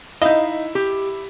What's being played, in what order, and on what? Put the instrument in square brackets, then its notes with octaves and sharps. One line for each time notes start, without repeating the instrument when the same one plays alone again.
[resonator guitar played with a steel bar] D#4 F5 [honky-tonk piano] E4 [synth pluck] D#5
[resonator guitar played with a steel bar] G4